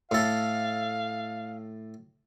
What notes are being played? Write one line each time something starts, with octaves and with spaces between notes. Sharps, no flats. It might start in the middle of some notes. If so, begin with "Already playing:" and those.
A2 A4 F5